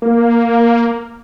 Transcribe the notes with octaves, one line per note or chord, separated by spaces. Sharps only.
A#3